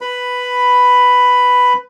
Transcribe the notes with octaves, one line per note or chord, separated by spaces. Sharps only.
B4 B5